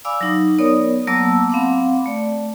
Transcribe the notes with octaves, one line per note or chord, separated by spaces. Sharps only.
D5 F5 G#5 B5 D6 E6
F#3 D#4
B3 A#4 C#5 D5 D#6
F#3 A#3 B3 A5 D6 E6
C4 F5 F#5 B5 D6
A3 D5